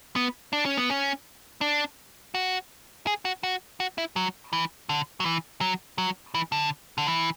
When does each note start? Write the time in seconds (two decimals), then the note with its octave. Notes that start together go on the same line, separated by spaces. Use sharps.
0.16 B3
0.53 D4
0.65 C#4
0.77 B3
0.90 C#4
1.61 D4
2.35 F#4
3.07 G#4
3.25 F#4
3.43 F#4
3.80 F#4
3.98 E4
4.16 F#3
4.53 E3
4.89 D3
5.20 F#3
5.26 E3
5.61 F#3
5.98 F#3
6.34 E3
6.52 D3
6.98 D3
7.07 E3